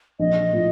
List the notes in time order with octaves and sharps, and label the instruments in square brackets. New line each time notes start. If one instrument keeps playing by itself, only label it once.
[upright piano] A#1 [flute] D#5
[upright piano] A2 F3